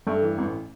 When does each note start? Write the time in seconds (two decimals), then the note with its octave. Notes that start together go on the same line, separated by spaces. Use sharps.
0.07 G2 A3
0.22 E3
0.38 A1